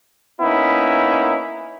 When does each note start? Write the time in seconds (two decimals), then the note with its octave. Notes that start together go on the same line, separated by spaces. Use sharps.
0.41 A#3 B3 C#4 D#4 E4